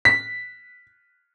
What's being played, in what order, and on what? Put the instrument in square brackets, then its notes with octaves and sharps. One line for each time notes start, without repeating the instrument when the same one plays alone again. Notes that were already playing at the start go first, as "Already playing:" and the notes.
[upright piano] B6